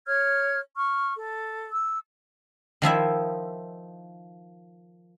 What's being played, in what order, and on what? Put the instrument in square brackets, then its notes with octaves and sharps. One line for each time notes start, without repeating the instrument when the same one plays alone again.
[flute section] C#5 F6 G#6
C#6 F6
A4
E6
[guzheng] D#3 F3 E4 E5